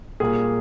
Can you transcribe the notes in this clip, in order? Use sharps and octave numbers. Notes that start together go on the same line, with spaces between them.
A#2 G3 A#3 G#4